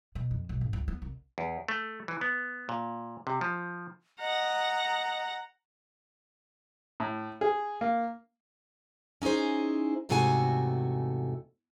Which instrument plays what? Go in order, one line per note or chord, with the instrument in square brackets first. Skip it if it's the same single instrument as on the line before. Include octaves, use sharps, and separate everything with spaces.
[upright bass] B2
F2
B1
G#1
C#2
B3
C2
[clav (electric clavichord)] E2
A3
E3
B3
A#2
C3
F3
[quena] D#5 [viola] F#5 A#5
[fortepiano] A2
G#4
A#3
[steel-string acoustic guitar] C#4 D#4 E4 G#4 C5
E2 G#2 C3 A3 F#4 G#5